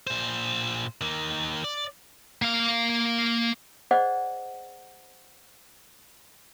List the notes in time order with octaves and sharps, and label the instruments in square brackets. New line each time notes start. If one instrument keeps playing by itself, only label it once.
[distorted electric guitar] A#2 C5
D#3 A#3
D5
A#3 F5
[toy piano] G#4 C5 D5 D#5 F#5